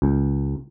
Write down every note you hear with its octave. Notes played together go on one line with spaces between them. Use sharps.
C#2